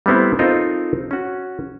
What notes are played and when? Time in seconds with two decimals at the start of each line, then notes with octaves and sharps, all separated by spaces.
0.06 G3 A3 B3 C4 E4
0.39 C4 D#4 F4 A4 A#4 D#5
1.11 C#4 F#4